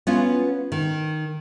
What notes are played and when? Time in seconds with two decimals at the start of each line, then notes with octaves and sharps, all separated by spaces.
0.07 B3 C#4 F4
0.72 D#3